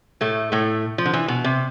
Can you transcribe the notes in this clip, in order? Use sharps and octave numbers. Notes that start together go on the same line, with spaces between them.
A2 A3
A2 A3
F3
D3
E3
B2
C3